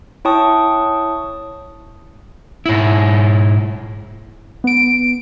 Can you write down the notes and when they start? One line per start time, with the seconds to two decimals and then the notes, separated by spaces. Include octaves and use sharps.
0.25 E4 C#5 G5 A5 C#6 D#6
2.66 G#2 E4
4.64 B3 D7